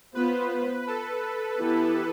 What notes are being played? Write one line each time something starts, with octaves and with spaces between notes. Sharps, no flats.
B3 F4 B4 C5
A4
E3 B3 E4 G4